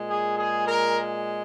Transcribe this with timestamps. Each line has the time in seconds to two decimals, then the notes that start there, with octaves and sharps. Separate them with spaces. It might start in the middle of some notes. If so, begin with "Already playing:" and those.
Already playing: A#2 G#3
0.10 G#4
0.38 G#4
0.68 A#4